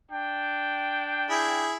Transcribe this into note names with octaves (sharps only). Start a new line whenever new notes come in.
D4 G5
E4 G#4